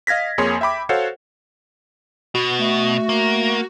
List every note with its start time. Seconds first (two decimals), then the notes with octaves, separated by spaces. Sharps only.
0.07 D#5 F5 G#6 A#6 B6
0.38 F2 A#3 G#4 C#5 G#5 C6
0.61 E5 G5 B5 D6
0.89 F#4 A4 C5 C#5 F5 F#5
2.35 B2 F#4
2.59 A3
3.09 A#3